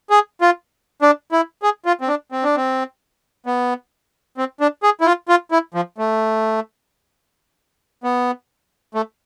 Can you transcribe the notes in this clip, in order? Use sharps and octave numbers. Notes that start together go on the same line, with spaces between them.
G#4
F4
D4
E4
G#4
F4
C4
D4
C4
D4
C4
B3
C4
D4
G#4
E4
F4
F4
E4
F3
A3
B3
A3